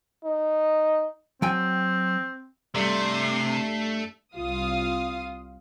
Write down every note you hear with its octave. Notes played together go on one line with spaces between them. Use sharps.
D#4
F#3 C4 G5 G#5
G2 C3 A3 C7
C2 F4 F5 D#6